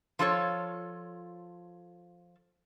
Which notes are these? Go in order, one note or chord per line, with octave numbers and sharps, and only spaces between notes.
F3 F4 A4 C#5